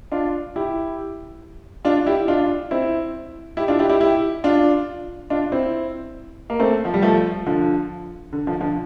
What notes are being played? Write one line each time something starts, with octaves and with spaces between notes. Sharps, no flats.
D4 F4
E4 G4
D4 F4
E4 G4
D4 F4
C4 E4
E4 G4
D4 F4
E4 G4
E4 G4
E4 G4
D4 F4
D4 F4
C4 E4
A#3
A3 C4
F3
G3
F3 A3
D3 F3
D3
D3 F3
D3 F3